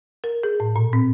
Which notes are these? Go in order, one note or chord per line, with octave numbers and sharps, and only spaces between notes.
A#4
G#4
A2
A#2
C4